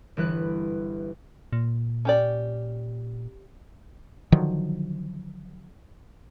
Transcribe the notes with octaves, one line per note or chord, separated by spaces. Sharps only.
G1 E3 B4 F#6
A#2
C#4 G4 D5
D3 D#3 F3 F#3